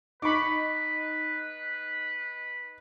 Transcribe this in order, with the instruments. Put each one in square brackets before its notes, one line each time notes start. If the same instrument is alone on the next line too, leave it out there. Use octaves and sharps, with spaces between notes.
[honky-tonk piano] D#4 [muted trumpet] B4 [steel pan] B5 C#6 D6